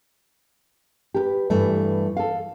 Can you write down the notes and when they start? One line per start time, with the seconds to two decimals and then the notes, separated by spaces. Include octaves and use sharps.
1.14 G4 A#4 B4
1.50 G2 E3 A3 B4
2.17 A4 F5